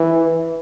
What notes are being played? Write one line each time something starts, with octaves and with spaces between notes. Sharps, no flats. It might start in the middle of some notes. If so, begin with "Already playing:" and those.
Already playing: E3